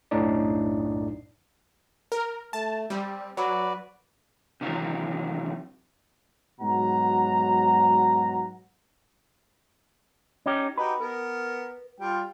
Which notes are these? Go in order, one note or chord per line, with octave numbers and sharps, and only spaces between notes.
B1 F#2 A2 D4 D#4 D5
A#4
A3 A5
G3 C4
F#3 F#4 B4 D5
C3 D#3 E3 F#3
G#2 B2 F#3 F#5 A#5
C#4 D#4 G4
D#4 F#4 G4 B4
B3 A#4
G3 F4 G5